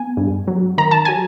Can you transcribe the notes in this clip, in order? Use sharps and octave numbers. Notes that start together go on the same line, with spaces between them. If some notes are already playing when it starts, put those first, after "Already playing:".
Already playing: B3 G#5
G2
F#3
D#3 A#5
A5
F#3 G#5